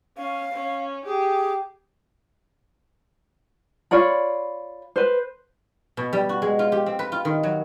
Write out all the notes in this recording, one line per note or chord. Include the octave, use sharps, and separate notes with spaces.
C#4 F5
C#4
G4 G#4
F4 C#5 D5 B5
B4 C5
B2
G3
F#4
G#3
F4
G4
C4
B4
F4
D#3
F#3